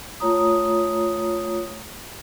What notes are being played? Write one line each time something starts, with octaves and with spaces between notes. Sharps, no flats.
A3 F4 C#5 A#5 D#6